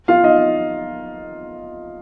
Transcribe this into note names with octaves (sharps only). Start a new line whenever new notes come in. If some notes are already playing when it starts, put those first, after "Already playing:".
F4 F5
D#4 D#5